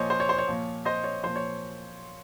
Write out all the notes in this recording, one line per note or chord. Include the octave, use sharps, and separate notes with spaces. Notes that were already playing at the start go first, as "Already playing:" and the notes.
Already playing: A#2 F3 C5 C#5 D#5
C5
C#5
C5
C#5
A#2 F3
C5 D#5
C#5
A#2 F3 C5
C#5